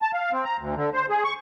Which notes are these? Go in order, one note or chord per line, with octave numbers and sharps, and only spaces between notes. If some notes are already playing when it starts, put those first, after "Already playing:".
A5
F5
C4
A#5
D2
D3
C5
G#4
C#6